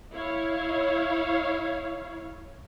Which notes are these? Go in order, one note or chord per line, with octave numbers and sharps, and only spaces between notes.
E4 C#5 F5